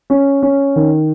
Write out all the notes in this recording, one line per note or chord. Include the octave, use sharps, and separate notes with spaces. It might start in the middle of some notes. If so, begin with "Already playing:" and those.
C#4
C#4
D#3